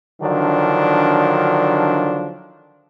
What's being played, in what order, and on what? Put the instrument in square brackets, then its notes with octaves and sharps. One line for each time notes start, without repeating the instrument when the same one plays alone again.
[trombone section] D3 D#3 F3 F#3 D4